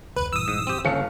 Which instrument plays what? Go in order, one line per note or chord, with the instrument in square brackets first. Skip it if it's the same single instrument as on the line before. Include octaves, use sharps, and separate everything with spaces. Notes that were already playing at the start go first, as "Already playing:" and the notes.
[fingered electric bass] F1 D2 [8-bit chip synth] B4
[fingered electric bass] A#1 G2 E3 [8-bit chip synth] D#6 E6
[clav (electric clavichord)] G#2
C4 G4
[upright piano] G1 F5 C#7 [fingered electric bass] C#3 A#3 [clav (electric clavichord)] C#4 A4